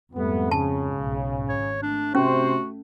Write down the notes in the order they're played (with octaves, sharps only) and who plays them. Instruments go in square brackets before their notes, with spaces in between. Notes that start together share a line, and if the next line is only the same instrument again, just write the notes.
[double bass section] F2 G#2 [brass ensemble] G3 A3 B3
[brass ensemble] C#3 [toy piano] A5
[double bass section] B1 G#2
[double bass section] G#1 [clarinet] C#5
[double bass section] A3 [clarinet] D4
[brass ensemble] C3 C5 [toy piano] C#4 [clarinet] F#4